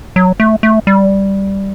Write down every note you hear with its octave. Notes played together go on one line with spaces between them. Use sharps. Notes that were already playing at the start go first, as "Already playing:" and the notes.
F#3
A3
A3
G3